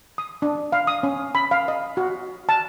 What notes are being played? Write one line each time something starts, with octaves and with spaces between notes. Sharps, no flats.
D#6
D4
F5
D#6
C#4
B5
F5
D#5
F#4
A5